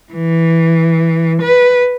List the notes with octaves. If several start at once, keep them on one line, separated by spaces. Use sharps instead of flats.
E3
B4